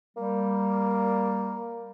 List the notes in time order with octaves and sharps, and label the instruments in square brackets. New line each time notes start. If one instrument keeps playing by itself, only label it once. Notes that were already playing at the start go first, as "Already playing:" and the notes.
[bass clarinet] G3 [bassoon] A#3